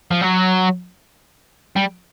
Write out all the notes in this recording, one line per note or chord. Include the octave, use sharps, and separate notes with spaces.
F3
F#3
G3